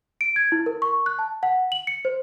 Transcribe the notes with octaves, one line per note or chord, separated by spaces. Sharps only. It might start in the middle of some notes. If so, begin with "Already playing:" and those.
D7
G#6
E4
A#4
C#6
F#6
A5
F#5
F#7
C#7
C5